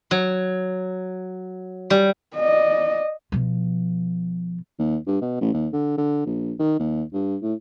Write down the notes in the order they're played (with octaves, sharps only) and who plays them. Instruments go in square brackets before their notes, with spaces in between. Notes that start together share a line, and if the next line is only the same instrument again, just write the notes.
[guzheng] F#3
G3
[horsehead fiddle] D5 D#5
[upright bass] B2 F3
[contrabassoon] D#2
G2
B2
A1
D#2
D3
D3
A#1
D#3
D#2
G2
A2